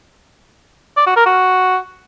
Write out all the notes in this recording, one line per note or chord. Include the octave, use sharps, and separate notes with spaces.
D5
F#4
A#4
F#4